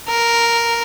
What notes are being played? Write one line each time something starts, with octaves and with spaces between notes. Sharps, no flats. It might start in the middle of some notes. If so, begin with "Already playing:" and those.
A#4